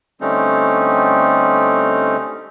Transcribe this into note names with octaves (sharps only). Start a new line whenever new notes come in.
D3 G3 A3 C4 C#4 D#4